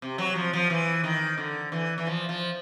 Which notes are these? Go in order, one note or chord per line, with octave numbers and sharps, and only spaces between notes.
C3
F#3
F3
F3
E3
D#3
D3
E3
E3
F3
F3